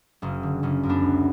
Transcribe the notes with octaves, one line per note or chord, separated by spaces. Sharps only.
F#1 C#4
D3
F#1 C#4
F#2
B3 D4
D2